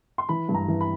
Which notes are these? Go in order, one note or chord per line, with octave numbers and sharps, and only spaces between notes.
C6
E3 B5
G2
A#5
E3
B5